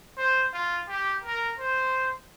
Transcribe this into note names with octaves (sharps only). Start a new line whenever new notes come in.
C5
F4
G4
A#4
C5